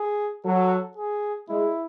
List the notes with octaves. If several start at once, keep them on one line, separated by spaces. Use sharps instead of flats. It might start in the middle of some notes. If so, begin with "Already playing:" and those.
Already playing: G#4
F#3 A4
G#4
G#3 E4